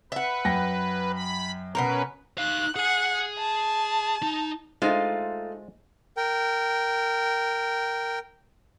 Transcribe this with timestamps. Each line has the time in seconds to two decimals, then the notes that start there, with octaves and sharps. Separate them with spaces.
0.12 B4 E5 F#5
0.45 F#2 G5 A#6
1.12 B5
1.75 B2 F3 C#4 A#4 B4
2.38 D#4 F5 F#6
2.76 G#4 F#5 G#5
3.39 A5
4.23 D#4
4.82 G#3 A3 D#4 F4 C5
6.17 A#4 G5